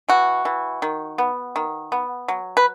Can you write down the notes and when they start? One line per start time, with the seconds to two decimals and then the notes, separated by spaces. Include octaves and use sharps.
0.09 E3 F#4
0.45 E3
0.82 D#3
1.18 B3
1.56 D#3
1.92 B3
2.28 F#3
2.57 B4